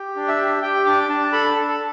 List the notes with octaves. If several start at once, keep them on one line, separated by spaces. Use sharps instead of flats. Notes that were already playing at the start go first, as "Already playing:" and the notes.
Already playing: G4
D4
E5
G4
G4 G5
D4 D6
D4 A5
A4 B5
A5
A4
A4